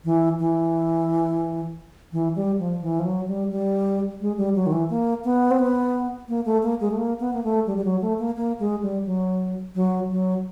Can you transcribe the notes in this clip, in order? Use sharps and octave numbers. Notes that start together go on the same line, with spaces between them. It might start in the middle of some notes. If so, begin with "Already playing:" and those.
E3
E3
E3
G3
F3
E3
F3
F#3
G3
G3
G#3
G3
F#3
D#3
E3
A#3
B3
C4
B3
A#3
A3
A#3
G#3
A3
A#3
B3
A#3
A3
G3
G3
F#3
A3
A#3
A#3
G#3
G3
F#3
F#3
F#3